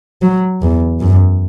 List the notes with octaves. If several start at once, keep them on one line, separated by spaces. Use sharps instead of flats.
F#3
E2
F#2